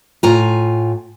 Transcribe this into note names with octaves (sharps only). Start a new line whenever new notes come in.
A2 F4 G#5 A#5